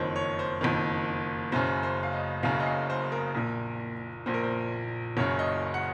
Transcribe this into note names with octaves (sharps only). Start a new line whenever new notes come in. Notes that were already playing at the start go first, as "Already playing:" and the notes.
Already playing: F#1 F2 D#3 C5 C#5
C#5
C5
F#1 F2 D#3
F#1 F#2 C#3 C5
C5
F5
D#5
F#1 F#2 C#3 F5
D#5
F5
C5
A#4
A#1 A#2
A#1 A#2 C5
A#4
C5
F#1 F#2 C#3 C#5
D#5
F#5